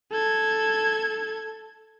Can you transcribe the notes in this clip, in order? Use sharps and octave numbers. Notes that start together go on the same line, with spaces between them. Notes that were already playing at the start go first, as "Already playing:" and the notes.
A4 G#6